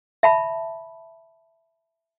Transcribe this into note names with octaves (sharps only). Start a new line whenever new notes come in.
E5 A5 B5